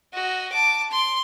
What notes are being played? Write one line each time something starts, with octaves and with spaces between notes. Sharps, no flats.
F#4 D#5
A5 D6
C6